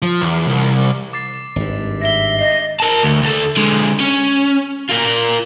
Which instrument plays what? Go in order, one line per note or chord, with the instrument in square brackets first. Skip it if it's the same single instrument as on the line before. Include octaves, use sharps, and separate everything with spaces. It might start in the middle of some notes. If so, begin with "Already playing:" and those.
[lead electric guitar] F3
E2
C2
[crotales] D6 A6 C7
D6
[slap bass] G#1 G2
[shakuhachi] E5 [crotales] A#6 G7
[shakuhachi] D#5 [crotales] C7
[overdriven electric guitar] A#4 A5
D2
D2 A4
D3 G#3
C#4
F4 A#4